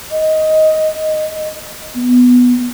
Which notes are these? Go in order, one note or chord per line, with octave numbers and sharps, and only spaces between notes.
D#5
B3